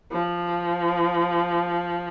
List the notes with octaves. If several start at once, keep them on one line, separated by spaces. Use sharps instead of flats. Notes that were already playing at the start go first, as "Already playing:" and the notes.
F3